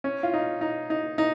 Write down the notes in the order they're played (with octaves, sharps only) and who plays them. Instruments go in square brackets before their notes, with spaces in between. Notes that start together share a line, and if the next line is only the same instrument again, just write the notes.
[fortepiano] C#4
F4
D#4
D#4
D#4
D#4